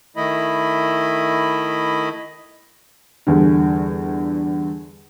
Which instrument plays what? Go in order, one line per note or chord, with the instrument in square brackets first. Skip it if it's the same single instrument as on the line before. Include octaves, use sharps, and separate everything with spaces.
[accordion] D#3 A3 E4 D#5 B5
[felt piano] E2 G2 D3